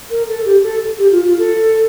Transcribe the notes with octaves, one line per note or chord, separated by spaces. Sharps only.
A#4
A4
G4
A4
G4
F4
F4
A4